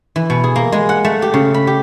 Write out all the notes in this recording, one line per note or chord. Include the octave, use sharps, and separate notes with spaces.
E3
B2
G#4
A#3
G#3
F#5
A3
G4
C#3
B5
G4